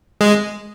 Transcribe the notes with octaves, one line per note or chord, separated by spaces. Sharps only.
G#3